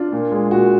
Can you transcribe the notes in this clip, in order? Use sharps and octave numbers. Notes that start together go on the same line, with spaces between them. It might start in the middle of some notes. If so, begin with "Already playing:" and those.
Already playing: D4 F4
A#2
G#3
A#2 F#4